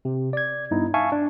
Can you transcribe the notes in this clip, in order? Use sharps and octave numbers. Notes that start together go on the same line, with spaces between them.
C3
D5 G#6
G2 B3 D#4 E4
E5 F5 G#5 A5 C#6
D4